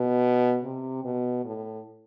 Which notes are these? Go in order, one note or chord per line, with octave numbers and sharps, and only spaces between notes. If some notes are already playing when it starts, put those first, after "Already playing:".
Already playing: B2
C3
B2
A2